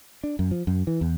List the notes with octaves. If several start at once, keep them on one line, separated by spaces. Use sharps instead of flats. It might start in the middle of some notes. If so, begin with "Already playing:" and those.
D4
F#2
F3
F#2
E3
E2